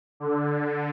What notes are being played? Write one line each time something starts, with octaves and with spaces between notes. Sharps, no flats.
D3